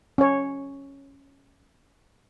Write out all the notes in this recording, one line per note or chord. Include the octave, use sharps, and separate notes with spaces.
C#4 C#5